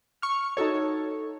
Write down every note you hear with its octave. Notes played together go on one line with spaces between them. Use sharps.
C#6 F6
D#4 F#4 A4 C#5